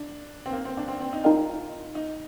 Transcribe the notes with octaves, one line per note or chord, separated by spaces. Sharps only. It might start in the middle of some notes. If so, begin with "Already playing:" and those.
Already playing: D4
C4
A#3
C4
D4
C4
C4
D#4
D#4 F4 A#4 D#5 G5
D#4